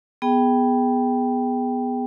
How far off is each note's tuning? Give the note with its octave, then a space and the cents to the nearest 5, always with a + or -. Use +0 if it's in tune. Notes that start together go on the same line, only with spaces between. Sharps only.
B3 +0 G#4 +0 G5 +0